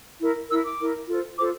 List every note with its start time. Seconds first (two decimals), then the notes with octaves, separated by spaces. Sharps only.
0.19 E4 A#4
0.48 E4 A#4 E6
0.64 D6
0.79 E4 A#4
1.08 F4 A4 C5
1.38 F4 A4 C5 D6